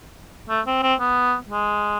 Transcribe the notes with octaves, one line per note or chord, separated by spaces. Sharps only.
A3
C4
C4
B3
G#3